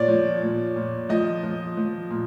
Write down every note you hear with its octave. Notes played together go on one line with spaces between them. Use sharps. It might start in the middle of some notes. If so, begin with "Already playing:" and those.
Already playing: A#2 C#5 D5
F3
A#2
A#2
F3 D#5
F3
F3
A#2